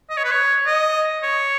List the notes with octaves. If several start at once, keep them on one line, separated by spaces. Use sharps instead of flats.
D#5
C#5
B4
C#5
D#5
C#5